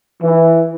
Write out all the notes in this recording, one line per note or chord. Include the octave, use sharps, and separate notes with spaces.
E3